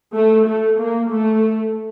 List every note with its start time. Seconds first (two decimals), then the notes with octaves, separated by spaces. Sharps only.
0.14 A3
0.46 A3
0.79 A#3
1.10 A3